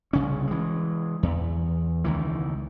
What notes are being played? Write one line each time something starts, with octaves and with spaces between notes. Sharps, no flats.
C2 C#3 C#4
E3 G#3
E2
C#2 D#3 E3